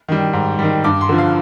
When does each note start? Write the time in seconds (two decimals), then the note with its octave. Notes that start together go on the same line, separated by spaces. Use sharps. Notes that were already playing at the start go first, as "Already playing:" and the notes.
0.08 D#3 G3
0.33 G#2
0.59 D#3 G3
0.84 G2 D6
1.01 C6
1.09 D3 F3
1.18 F5